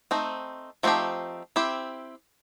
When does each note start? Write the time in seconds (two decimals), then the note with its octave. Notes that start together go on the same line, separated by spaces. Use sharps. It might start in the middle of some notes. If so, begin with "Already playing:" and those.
0.11 A3 C4 D#4
0.83 F3 A3 C4 D#4 G4
1.56 C4 E4 G4